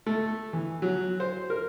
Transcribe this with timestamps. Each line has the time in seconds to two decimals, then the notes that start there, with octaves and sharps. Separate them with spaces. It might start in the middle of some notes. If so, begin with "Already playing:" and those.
0.06 A3
0.53 E3
0.82 F#3
1.20 C5
1.50 A#4